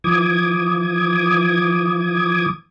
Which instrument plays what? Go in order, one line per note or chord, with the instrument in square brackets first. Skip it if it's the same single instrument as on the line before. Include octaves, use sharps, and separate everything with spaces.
[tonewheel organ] E3 F3 D6 D#6 G#6